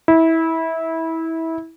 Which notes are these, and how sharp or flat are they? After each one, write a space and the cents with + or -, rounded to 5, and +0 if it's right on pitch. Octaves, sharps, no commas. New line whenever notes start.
E4 -20